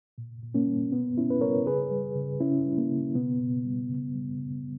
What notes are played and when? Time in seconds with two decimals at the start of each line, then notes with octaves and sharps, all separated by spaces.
0.18 A#2
0.43 A#2
0.54 A#3 C#4
0.67 G3
0.92 B2 B3
1.17 B2 C#4 E4
1.30 B4
1.41 G3 A#4 C#5
1.67 C#3 G#4 B4
1.91 G3
2.16 C#3
2.41 C#3 C#4 E4
2.66 G3
2.78 A#3
2.90 C#3
3.15 B2 B3
3.40 B2
3.65 G3
3.90 C#3
4.15 G3
4.39 C#3